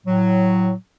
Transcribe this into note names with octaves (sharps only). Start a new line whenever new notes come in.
A2 F#3